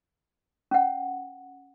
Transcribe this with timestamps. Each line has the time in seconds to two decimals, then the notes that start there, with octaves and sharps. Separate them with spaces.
0.71 C#4 F#5